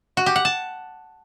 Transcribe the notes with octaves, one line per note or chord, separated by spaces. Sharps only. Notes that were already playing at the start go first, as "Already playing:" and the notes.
F#4
G4
F#5
A5